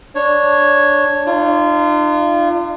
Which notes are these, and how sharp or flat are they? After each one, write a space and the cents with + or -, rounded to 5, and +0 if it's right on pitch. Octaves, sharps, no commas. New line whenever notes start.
D4 +0 C#5 +0
D4 +45 F4 -25